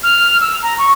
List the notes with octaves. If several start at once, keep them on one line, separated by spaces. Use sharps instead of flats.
F6
E6
A#5
C#6